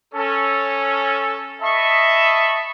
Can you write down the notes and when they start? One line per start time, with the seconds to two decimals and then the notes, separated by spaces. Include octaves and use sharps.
0.14 C#4 A4
1.62 D#5 E5 A5 B5 C#6